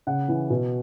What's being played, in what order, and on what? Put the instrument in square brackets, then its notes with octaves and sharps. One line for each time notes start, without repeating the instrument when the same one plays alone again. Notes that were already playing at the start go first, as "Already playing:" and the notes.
[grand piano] C#3 F#5
E3
B2